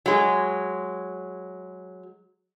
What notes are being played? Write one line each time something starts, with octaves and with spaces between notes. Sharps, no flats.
F#3 G#3